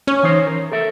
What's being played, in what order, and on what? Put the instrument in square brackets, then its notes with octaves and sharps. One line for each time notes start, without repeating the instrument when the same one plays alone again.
[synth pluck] C#4
[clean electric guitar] E3 D#4 C5
A#4
A4 A#4 E5